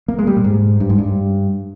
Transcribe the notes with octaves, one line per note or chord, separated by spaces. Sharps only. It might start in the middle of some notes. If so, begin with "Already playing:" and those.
A#3
G#3
G3
A#2
G#2
G2
G#2
G2